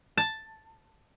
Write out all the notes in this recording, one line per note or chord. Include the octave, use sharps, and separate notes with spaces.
A5